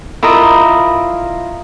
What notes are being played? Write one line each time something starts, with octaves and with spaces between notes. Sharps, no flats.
E4 F4 A#4 D#5